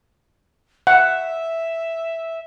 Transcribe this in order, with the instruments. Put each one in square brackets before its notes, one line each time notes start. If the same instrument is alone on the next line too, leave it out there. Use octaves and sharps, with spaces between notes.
[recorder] E5 [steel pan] F#5